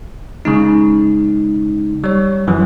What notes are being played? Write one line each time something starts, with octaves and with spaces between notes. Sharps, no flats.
C#3 G#3 D#4
G3 C#5
F#2 E3 F#3